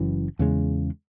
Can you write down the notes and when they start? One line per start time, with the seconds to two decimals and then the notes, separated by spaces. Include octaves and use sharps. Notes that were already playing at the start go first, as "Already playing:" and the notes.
Already playing: F#1 F#2 E3
0.39 E2 C#3 G#3